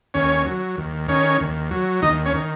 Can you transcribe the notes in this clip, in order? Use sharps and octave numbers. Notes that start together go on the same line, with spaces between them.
D#2 C#4 C#5
F#3
D#2
D#3 C#4 C#5
D#2
F#3
D#2 D#4 D#5
C#4 C#5
D#3